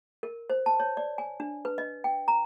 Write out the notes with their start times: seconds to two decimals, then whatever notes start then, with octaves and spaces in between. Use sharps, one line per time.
0.23 A#4
0.50 C5
0.66 A5
0.80 C#5
0.97 D5
1.18 G#5
1.40 D4
1.65 B4
1.78 D#5
2.04 G5
2.28 A#5